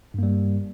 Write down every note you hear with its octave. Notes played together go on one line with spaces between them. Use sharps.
G2 G3 A#3